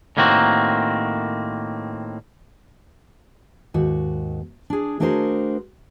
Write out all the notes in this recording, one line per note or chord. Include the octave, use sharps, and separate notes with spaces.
A2 D#3 A#3 C4 F#4
D#2 G#2 F#4
D4 G#4
A3 D4 F#4 G#4 A#4 C5